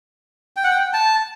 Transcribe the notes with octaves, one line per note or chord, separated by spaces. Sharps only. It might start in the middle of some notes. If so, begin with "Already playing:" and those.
G5
F#5
G5
A5